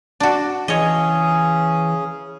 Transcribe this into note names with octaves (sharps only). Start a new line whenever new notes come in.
D4 F#4
C#3 E3 C#4 G#4 C#5 D#5